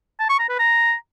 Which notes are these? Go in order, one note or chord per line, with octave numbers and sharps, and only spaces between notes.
A5
C#6
A#5
B4
A#5